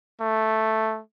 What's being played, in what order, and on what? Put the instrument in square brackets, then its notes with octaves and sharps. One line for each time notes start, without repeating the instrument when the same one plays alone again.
[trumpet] A3